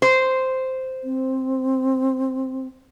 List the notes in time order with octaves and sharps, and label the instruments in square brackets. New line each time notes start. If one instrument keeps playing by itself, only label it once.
[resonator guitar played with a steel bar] C5
[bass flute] C4